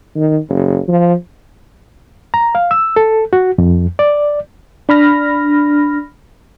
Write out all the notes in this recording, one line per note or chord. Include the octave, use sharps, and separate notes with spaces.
D#3
F#1
F3
A#5
F5
E6
A4
F#4
F2
D5
D4 B5 F6 A#6